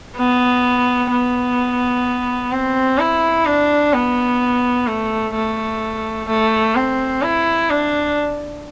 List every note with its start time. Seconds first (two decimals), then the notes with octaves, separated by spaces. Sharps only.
0.17 B3
1.11 B3
2.52 C4
2.98 E4
3.46 D4
3.93 B3
4.87 A3
5.34 A3
6.28 A3
6.76 C4
7.22 E4
7.70 D4